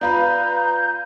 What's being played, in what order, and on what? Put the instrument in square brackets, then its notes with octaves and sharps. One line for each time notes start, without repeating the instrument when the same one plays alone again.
[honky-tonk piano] B3 F4 B4 [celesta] D5 F5 B5 [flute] A#5 [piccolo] G6